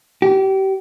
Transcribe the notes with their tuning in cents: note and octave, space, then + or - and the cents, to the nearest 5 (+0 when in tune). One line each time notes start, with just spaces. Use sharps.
G4 -30